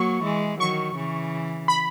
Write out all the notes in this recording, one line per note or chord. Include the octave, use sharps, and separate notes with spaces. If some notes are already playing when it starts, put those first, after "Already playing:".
Already playing: F#3 A#3 C#6
E3 G#3
D#3 F#3 C#6
C#3 E3
B5